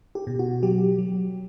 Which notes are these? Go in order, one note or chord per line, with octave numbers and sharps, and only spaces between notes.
G4
B2
F#4
F#3 G4
F#3